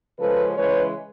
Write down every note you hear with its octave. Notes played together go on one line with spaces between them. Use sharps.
C#3 F3 G#3 C#4 A4 B4
C#3 E3 G#3 B4 C#5